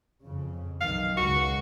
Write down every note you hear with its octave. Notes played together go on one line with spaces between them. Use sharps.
F2 C#3
B1 D#3 F5
C#2 F#4